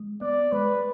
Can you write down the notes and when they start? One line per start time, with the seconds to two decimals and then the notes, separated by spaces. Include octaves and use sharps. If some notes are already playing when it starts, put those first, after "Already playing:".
Already playing: G#3
0.21 B3 D5
0.52 G#3 B4